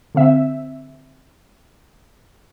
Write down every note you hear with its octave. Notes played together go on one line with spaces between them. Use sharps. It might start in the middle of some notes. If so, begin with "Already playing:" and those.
D3 C4 E5